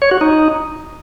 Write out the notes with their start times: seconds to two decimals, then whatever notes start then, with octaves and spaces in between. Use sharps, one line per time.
0.02 C#5
0.11 F#4
0.21 D#4